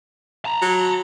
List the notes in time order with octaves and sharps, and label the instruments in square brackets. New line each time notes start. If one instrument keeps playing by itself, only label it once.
[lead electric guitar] A5 A#5
[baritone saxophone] F#3